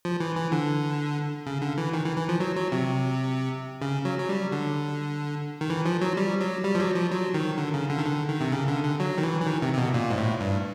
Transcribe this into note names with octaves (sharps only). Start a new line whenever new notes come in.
F3
E3
E3
D3
C#3
D3
E3
D#3
E3
E3
F3
F#3
F#3
C3
C#3
F#3
F#3
G3
D3
D#3
E3
F3
F#3
G3
F#3
G3
F3
F#3
F3
F#3
D#3
D3
C#3
D3
D#3
D3
D#3
C3
C#3
D3
D3
F#3
D#3
E3
E3
D#3
C3
C3
B2
A#2
G#2
A2
G2